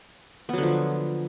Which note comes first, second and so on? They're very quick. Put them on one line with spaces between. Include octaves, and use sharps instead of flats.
B3 F#3 D3 F3